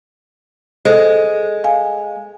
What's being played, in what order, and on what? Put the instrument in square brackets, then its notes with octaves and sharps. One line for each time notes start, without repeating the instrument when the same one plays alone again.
[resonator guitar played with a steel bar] G#3 [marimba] A4 C5
[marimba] F5 G#5